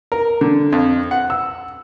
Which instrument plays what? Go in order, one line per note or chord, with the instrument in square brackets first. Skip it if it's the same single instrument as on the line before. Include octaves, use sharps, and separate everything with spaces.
[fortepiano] A#4
D3
F2
F#5
E6